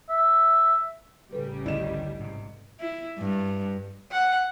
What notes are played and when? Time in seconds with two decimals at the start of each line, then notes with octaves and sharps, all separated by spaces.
0.09 E5
1.32 A1 C#3 G3 A4 B4
1.66 D2 G2 D#3 E4 D5 D#5 E7
2.20 G#2 C3
2.79 E4
3.19 G2
4.11 F#5